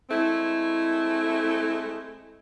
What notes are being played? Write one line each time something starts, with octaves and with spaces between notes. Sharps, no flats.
G#3 A3 C4 E4